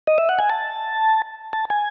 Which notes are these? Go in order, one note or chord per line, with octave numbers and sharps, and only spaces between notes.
D#5
E5
F#5
G#5
A5
A5
G#5